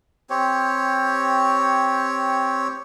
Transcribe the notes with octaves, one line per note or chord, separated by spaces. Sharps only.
C4 G4 C#5